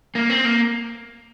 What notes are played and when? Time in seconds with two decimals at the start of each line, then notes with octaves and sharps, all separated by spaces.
0.15 A#3
0.30 C4
0.45 A#3